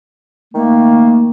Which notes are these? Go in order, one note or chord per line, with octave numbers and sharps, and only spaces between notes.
D#3 A3 A#3